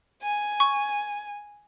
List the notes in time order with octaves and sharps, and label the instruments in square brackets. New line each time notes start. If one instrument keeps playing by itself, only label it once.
[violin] G#5
[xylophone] C#6